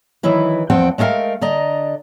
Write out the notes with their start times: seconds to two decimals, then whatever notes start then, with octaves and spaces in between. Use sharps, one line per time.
0.23 D#3 E3 F#3 E4 B4
0.70 E2 F3 C4 F#5 G5
0.98 G#3 A3 B3 A#4 F5 G5
1.41 D3 D5 D#5 A#5